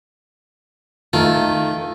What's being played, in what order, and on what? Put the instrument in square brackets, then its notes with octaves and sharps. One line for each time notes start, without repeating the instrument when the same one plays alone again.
[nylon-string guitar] D#3 [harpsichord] A3 F4